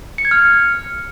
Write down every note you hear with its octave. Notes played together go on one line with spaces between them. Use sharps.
C#7
G#6
F6